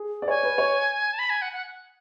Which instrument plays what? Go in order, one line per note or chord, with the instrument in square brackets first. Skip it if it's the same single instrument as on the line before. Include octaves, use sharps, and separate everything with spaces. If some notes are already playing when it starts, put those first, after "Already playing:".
Already playing: [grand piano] G#4
D5
[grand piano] C#5 [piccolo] G#5
[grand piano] B4
C#5
[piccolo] A5
B5
G#5
F#5
F#5